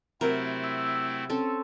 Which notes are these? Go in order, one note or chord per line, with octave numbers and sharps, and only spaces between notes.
C3 F#3 A3 C4 E4 A#4
E6
C4 C#4 A4